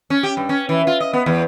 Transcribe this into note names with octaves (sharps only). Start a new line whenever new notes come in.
C#4
G4
G2
C#4
E3
F4
D#5
B3
E2